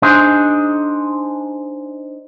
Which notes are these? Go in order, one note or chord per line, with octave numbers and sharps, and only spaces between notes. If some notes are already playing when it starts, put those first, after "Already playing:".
D4 D#4 G#4 C5